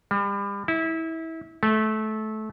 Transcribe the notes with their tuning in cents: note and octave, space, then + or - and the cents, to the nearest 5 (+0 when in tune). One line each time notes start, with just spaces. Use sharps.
G3 +35
E4 -25
A3 -20